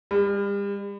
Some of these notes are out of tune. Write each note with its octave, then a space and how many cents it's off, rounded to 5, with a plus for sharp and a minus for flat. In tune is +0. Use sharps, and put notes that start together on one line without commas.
G3 +40